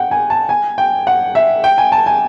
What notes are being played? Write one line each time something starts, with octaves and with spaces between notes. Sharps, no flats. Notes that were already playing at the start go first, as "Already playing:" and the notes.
Already playing: F#5 G5
G#5
A5
G#5
G5
F#5
E5
G5
G#5
A5
G#5